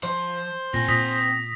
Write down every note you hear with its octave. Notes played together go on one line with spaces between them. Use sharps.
F3 C5
A#2 C4 G#5 A#6
A#2 D#6 A#6 B6